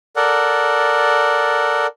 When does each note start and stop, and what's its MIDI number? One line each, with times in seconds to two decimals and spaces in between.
0.16 1.87 69
0.16 1.87 70
0.16 1.87 74
0.16 1.87 78